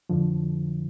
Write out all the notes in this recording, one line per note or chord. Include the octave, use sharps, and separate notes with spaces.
F2 D3 F3